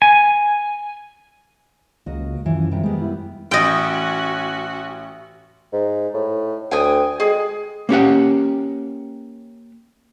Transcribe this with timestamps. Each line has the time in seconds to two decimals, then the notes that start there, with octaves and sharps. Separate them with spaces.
0.02 G#5
2.06 C#2 A#3 F#4 D#5
2.46 F#2 E3 F3
2.71 F2 C3 G3
2.83 G3 G#3 A#3 B3
3.01 E4
3.51 A1 C#4 F#4 D#5 G5
5.72 G#2
6.14 A2
6.71 D2 G5 G#5 D#6
7.20 G#3 G#4
7.89 A#3 C#4 G4 F#5